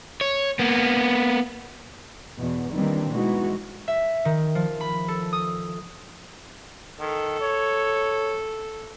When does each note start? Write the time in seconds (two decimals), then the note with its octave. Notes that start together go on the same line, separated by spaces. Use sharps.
0.21 C#5
0.59 A#3 B3
2.38 E2 B2
2.73 D#3 E3 G3 A#3 C4 D4
3.11 B2 E3 G#3 D#4 F#4
3.88 E5
4.25 D#3
4.55 F3
4.81 B5
5.08 A4
5.33 D#6
7.00 D#3 A4
7.41 C#5